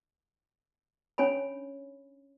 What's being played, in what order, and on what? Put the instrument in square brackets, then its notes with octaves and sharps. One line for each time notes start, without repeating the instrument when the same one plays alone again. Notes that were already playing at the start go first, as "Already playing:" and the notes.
[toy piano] C#4 D4 C#5 G#5 B5